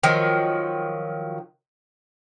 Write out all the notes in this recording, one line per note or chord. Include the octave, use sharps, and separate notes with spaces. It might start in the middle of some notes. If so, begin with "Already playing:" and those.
D#3 F3 F#3